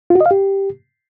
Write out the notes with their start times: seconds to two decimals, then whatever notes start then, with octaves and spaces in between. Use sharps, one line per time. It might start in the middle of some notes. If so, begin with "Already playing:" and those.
0.10 F4
0.15 F#4
0.21 D#5
0.26 F5
0.31 G4